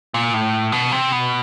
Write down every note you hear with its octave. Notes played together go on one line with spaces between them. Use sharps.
A#2
A2
B2
C3
B2